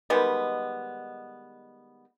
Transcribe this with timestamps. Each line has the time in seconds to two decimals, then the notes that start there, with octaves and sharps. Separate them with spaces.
0.10 D#3 G3 G#3 B3